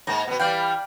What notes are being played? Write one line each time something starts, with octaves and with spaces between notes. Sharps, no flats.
G#2 A#3 A#5
B2 B3
E3 G3 D5 F5 G5